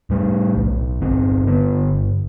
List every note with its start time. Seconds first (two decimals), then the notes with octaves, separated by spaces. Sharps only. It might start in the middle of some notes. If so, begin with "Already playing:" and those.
0.10 A2 G3
0.55 B1
1.01 G1 C4
1.47 D3 B3